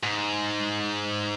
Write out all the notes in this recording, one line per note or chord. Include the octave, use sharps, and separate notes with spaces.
G#2